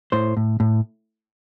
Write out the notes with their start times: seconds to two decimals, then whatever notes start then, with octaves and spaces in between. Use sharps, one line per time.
0.12 A2 C5
0.37 A2
0.60 A2